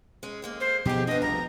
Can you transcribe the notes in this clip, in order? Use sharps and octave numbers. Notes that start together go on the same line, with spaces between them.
G#3 C#4
F2 G#3 A#3
C5
B2 F3 B3 D#4 G4 G#4
F3 B3 D4 D#5
F1 C2 F3 A#4 A#5